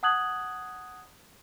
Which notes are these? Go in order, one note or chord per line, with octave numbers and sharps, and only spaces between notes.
F#5 A5 D#6 F#6 G#6 F#7